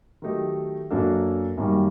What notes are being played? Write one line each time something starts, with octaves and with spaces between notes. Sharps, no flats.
D#3 F#3 A3 D#4 G4
F#2 F#3 A#3 D4 A4
F#2 D#3 G3 A#3